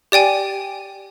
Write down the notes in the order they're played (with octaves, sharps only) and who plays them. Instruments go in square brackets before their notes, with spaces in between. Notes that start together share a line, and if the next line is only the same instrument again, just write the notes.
[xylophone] G4 D5 G5 G#5